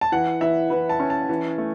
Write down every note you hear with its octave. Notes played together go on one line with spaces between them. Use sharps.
A5
E3 F#5
E3 E5
E3 B4
A5
C#4
A5
E3
A3